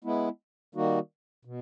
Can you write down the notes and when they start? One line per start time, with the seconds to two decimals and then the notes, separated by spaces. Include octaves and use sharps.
0.04 G#3 B3 E4
0.75 D#3 G3 A#3 D#4 F#4
1.45 B2